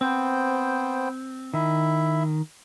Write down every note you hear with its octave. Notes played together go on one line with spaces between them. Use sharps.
B3 C4 C5 G5
D#3 E4 E5